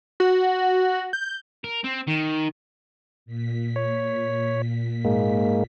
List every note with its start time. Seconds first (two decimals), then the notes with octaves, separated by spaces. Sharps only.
0.20 F#4
1.13 G6
1.64 A#4
1.84 C4
2.08 D#3
3.26 A#2 B6
3.76 C#5
5.05 G#2 G#3 A#3